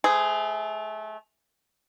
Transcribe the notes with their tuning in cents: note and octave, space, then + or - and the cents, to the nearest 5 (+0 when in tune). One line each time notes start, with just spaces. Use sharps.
A3 -25 G#4 +0 C5 -35